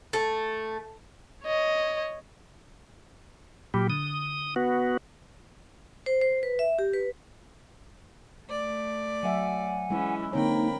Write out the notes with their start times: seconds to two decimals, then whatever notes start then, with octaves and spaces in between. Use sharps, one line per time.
0.13 A3
1.44 C#5 D#5
3.74 A#2 F#3 G4 B5
3.90 D3 D#6
4.56 B3 F#4
6.06 C5
6.21 C5
6.43 B4
6.59 E5
6.79 G4
6.93 B4
8.45 A3 D5
9.23 F#3 E5 F#5 G#5
9.90 E3 G#3 C#4 E4
10.33 D3 A#3 C4 D#4 A#4 C#5 G5 B5